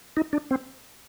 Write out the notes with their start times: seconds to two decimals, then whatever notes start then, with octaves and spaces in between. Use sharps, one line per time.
0.17 D#4
0.33 D4
0.51 C4